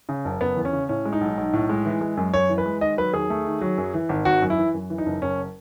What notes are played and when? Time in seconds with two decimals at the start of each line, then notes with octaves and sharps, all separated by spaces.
0.09 C#3
0.25 F#1
0.41 F#1 B3
0.57 E2
0.65 C#4
0.73 C#3
0.89 A2 C#4
1.05 G#3
1.13 D#4
1.21 B1
1.38 B1
1.53 A2
1.69 G#3
1.86 E3
2.01 G#3
2.17 F#2
2.34 F#2 C#5
2.49 E3
2.58 B4
2.66 G#3
2.81 D#3 D#5
2.97 F#3 B4
3.14 D#2 G#4
3.30 A3
3.46 D#3
3.61 F#3
3.78 F#2
3.94 E3
4.09 G#1
4.25 G#1 F#4
4.42 F#2
4.50 E4
4.58 E3
4.74 F#2
4.90 E3
4.98 D#4
5.06 F#1
5.22 F#1 C#4